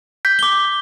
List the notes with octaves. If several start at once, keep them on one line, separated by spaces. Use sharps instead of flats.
G6 B6
D6 G7